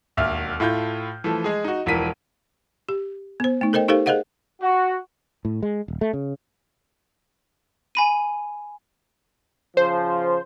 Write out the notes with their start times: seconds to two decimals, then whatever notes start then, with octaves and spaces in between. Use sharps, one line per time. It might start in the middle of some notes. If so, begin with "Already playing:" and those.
0.17 E1 D#2 E5 F6
0.60 A2 E4 F4 A4 G6
1.24 E3 F3 A3
1.44 G#3 G#4
1.64 D#4 F#4
1.86 E1 E3 F3 A#4 B6 D#7
2.89 G4
3.40 B3 C5
3.61 A3 D#4
3.73 A4 A#4 C5 D#5 G5
3.88 D#4 G4 A4 A#4 C5 F5
4.06 G#4 A#4 C5 D#5 F5 F#5
4.62 F#4
5.45 A2
5.63 G#3
5.88 D#1
6.01 A3
6.13 C#3
7.95 G#5 B5 D#7
9.77 C#3 F3 C5